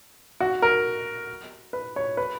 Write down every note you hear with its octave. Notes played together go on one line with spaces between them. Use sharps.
F#4
A#4
B4
C#5
B4